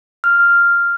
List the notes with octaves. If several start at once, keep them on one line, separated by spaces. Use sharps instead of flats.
F6